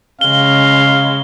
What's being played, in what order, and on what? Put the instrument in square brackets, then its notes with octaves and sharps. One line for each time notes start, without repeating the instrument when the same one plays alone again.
[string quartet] C#3 G#3 [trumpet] F5 [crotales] G7